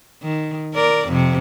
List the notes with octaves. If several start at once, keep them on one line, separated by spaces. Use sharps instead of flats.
D#3
A#4 D5
F2 C3